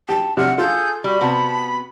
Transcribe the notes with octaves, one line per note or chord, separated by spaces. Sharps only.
G4 A5
C3 D5 F#5 F6
F4 G#4 A4 G6
G3 F#4 B5
C3 B3 F#4 A5